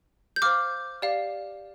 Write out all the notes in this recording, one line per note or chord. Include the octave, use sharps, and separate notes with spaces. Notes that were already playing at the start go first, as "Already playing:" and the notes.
G6
C5 F5 D6 F6
G4 D5 F5